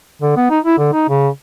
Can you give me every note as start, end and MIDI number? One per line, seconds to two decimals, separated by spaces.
0.22 0.34 50
0.37 0.48 59
0.51 0.59 63
0.65 0.78 64
0.78 0.91 50
0.93 1.05 63
1.09 1.28 49